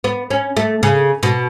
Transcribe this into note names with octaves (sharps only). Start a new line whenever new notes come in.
B3
C#4
A3
C#3
B2